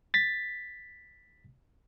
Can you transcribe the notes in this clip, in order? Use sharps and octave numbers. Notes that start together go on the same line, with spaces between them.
A6 B6